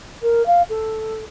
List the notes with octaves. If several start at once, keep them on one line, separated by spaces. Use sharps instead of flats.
A#4
F5
A4